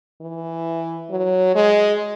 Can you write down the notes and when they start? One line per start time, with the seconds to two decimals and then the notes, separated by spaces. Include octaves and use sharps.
0.21 E3
1.11 F#3
1.55 G#3